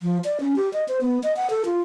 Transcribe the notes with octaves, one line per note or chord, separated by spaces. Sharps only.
F3
D5
C#4
G4
D#5
C5
B3
D#5
F#5
A4
F4